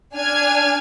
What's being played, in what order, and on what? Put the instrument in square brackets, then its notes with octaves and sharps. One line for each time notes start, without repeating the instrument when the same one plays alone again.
[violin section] D4 G#5 F6 G#6